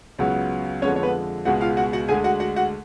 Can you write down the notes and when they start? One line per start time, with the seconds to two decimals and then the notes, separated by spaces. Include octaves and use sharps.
0.19 C#2 C#3 F#3 B3
0.82 F2 D3 G#3 B3 C#4 C#5
0.96 C#5
1.03 B3 B4
1.45 C#2 B2 G#3 B3 F#4 F#5
1.61 F4 F5
1.77 F#4 F#5
1.93 F#4 F#5
2.08 D2 D3 G#3 G#4 G#5
2.24 F#4 F#5
2.40 F#4 F#5
2.56 F#4 F#5